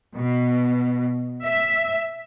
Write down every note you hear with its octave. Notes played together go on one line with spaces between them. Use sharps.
B2
E5